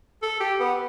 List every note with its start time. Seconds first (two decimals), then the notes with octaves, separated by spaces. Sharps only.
0.22 A4
0.40 G4
0.60 B3